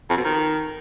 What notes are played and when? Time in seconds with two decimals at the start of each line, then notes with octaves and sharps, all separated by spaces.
0.09 F2
0.17 B2
0.25 D#3